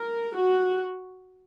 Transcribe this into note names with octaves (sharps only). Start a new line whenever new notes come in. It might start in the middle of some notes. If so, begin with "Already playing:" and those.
Already playing: A#4
F#4